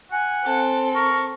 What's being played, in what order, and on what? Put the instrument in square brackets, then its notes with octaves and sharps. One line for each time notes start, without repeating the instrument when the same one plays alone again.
[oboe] F#5 [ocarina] G#5
[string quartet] C4 A4
[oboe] A#4 [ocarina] C#6